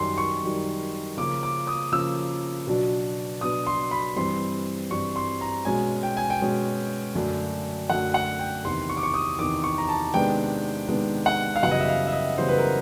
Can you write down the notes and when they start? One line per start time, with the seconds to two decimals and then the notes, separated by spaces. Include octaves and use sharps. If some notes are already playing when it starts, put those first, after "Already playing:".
Already playing: F#2 D#3 G3 C6
0.18 C#6
0.43 F#2 D#3 G3
1.17 C#3 F3 A#3 C#4 D6
1.43 D6
1.67 D#6
1.92 C#3 F3 A#3 C#4 E6
2.67 B2 F#3 B3 D4
3.41 B2 F#3 B3 D4 D#6
3.67 C6
3.91 B5
4.16 G2 E3 G3 C4 C6
4.91 G2 E3 G3 C4 C#6
5.16 C6
5.41 A#5
5.65 B2 G#3 C#4 G#5
6.03 G5
6.17 G#5
6.30 G5
6.41 B2 G#3 C#4
7.15 F#2 D3 F#3 A3 D4
7.90 F#2 D3 F#3 A3 D4 F#5
8.14 F#5
8.39 G5
8.64 E2 C3 D#3 C6
8.89 C#6
8.97 D6
9.03 C#6
9.14 D#6
9.38 E2 C3 D#3 D6
9.64 C#6
9.78 A#5
9.89 A5
10.14 C3 D#3 G#3 B3 D4 G5
10.88 C3 D#3 G#3 B3 D4
11.26 F#5
11.56 F5
11.63 F#2 C#3 E3 G3 B3 F#5
11.71 D#5
11.79 E5
11.88 F5
12.07 E5
12.12 D#5
12.38 F#2 C#3 E3 G3 B3 C5
12.48 B4
12.58 A#4